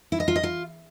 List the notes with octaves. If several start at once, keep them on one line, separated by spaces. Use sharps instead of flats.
E4
D#5
F4
D#5
F4